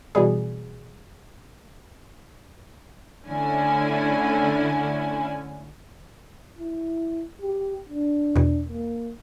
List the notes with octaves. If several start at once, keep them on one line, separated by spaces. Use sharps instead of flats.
B2 E3 G3 G#4
D3 A3 C#4 E4 G#5
E4
G4
D4
E2 B2
A#3